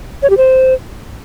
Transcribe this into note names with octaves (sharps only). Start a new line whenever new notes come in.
C#5
G4
C5